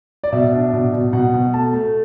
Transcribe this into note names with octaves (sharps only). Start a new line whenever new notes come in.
D5
B2 E5
D4
B2
B2
B2 F#5
B2
A3 A5
A3